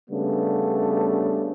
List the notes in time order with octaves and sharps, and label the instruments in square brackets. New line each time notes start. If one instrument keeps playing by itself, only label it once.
[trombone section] C#3 G3 A3 B3 D4